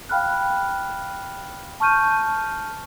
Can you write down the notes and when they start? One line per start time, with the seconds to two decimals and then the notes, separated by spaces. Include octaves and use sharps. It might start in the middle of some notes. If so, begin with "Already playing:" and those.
0.09 F5 G5 B5 F6 F#6
1.80 A5 C#6 F6 G6 D#7